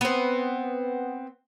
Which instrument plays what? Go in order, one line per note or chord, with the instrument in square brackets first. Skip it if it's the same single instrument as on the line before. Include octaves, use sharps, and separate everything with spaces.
[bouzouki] B3 C4